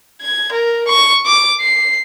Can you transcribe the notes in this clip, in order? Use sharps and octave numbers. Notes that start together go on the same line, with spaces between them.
G#6
A#4
C#6
D6
C7